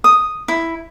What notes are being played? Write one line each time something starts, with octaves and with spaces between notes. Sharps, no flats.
D#6
E4